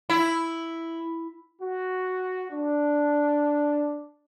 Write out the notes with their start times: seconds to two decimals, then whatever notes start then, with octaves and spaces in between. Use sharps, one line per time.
0.10 E4
1.61 F#4
2.51 D4